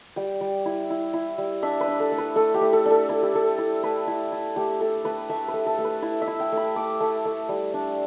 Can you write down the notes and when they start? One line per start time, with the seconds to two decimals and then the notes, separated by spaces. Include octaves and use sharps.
0.16 G3 G5
0.41 G3
0.65 E4
0.90 E4
1.13 E4
1.38 G3
1.62 D4 E5
1.81 B4
1.88 D4
2.00 A4
2.12 A3
2.18 B4
2.36 A3 A4
2.54 G4
2.61 A3
2.73 A4
2.86 D4 A4
3.09 E4 A4
3.23 G4
3.33 A3 A4
3.58 E4
3.83 A3 B4
4.07 E4
4.32 E4
4.56 A3 G4
4.80 A3 A4
5.05 A3 B4
5.30 A3 E5
5.48 B4
5.53 A3
5.66 A4
5.78 A3
5.84 B4
6.02 E4 E5
6.22 E5
6.27 E4
6.40 G5
6.52 A3 B5
6.76 A3 D6
7.00 A3
7.25 A3
7.49 G3
7.74 D4